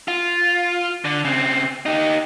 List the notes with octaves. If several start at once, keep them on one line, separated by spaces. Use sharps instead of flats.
F4
D3
C#3 C4
D#4 G4